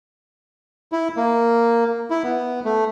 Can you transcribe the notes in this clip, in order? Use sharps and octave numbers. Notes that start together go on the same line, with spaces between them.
E4
A#3
E4
B3
A3